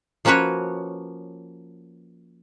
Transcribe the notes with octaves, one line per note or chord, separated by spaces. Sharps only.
F3 A#3 C#4 F#4 B4 C#5